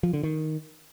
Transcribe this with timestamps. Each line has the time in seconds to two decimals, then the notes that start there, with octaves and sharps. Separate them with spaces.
0.03 F3
0.13 D3
0.23 D#3